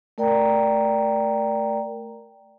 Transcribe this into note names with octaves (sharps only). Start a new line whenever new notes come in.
A3 A#4 D5 G5 A#5